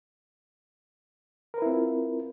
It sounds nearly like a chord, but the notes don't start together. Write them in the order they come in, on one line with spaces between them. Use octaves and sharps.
A#4 B4 E4 C4 F4